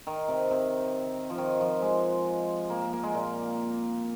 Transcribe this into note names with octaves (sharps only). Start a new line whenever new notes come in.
D#3
C3
C3
F3
D#3
F3
G#3
A#3
A#3
A#3
G#3
A#2